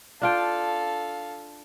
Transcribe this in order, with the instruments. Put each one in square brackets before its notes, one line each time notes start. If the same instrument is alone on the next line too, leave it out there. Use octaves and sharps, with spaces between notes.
[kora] D4 F4 G5 [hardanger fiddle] A4 F5